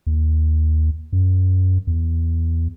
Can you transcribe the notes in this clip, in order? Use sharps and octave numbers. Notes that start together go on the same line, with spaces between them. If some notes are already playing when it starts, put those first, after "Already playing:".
D#2
F#2
E2